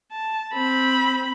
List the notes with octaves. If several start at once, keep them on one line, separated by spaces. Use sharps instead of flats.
A5
C4 B5